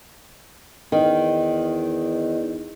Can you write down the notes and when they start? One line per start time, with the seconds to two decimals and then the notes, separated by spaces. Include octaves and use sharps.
0.92 E2 D#3